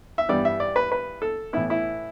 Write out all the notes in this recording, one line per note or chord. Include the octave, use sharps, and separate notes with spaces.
E5
G2 E3 G3 B3 D5
E5
D5
B4
B4
A4
A2 E3 B3 E4
E4